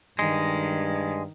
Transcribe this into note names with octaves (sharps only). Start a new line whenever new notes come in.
G2 D#3 G#3